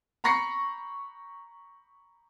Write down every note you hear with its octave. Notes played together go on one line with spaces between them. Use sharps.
A#5 B5 C#6 A#6 C7 C#7